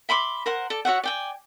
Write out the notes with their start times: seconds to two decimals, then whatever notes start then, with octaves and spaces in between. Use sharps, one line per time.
0.09 E5 B5 C6 D6
0.46 A#4 C5 F#5
0.70 A4 D5
0.85 F#4 C#5 E5 F#5
1.04 D5 G5 G#5